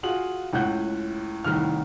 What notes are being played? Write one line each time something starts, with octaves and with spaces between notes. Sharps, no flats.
F4 F#4 G#4 F5 F#7
C#2 A2 F#5 F#6 G6
C2 A2 D#3 F6